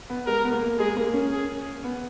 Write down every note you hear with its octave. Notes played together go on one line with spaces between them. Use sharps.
B3
G#3 A#4
B3
A#3
G#3 G#4
A#3
C#4
G#4
B3